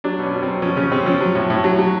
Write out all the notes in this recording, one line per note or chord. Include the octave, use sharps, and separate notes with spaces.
F#3 D4
B2 C#4
B2
F#3 C4
F3 C#4
C#3 C#4
C#3 C4
F3 C#4
F#3
A2
A2
F#3
F#3